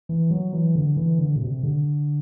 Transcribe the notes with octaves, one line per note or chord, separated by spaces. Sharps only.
E3
F#3
E3
D3
E3
D3
B2
C3
D3